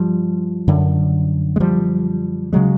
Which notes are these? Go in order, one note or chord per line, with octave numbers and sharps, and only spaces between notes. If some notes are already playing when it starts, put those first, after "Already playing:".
Already playing: G2 F3 G3
F#2 D3
G#3
F3 G3
C#3 F#3 G#3